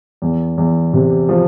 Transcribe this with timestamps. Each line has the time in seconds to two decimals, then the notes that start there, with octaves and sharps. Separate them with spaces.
0.22 E2
0.58 E2
0.93 C3
1.29 F3